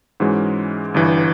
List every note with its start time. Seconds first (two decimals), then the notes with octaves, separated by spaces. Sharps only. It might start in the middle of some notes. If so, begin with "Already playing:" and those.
0.20 G#2 E3 G#3 C#4 F#4
0.94 G1 G2 E3